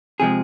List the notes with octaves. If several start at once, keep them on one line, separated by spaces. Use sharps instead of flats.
C3 F3 G#3 G#4